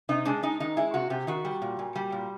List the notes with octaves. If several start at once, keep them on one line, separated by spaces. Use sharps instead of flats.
C3 D#4
G#3 D4
G#3 D#4
D#3 D#4
G#3 E4
C3 F#4
C3 G4
D#3 F#4
G3
A#2
A#2
G3
A#2